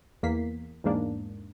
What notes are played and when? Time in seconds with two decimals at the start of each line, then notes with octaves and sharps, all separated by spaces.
0.23 E2 A#3 B6 C7
0.84 E2 G#2 G#3 A#3 D4